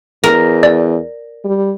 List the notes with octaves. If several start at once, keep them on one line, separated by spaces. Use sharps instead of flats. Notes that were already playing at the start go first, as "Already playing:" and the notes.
E2 A#4
D5
G3